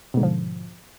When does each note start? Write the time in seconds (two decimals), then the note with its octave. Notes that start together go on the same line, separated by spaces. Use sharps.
0.14 B2
0.17 G#2
0.20 D3
0.23 F3